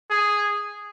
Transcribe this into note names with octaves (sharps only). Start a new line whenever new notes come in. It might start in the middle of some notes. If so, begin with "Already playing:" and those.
G#4